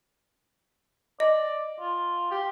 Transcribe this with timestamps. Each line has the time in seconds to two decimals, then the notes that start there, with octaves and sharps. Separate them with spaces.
1.20 D5 D#5
1.80 F4
2.31 G4